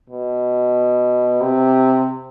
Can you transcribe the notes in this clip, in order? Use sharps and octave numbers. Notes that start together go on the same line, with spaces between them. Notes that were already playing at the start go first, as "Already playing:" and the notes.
B2
C3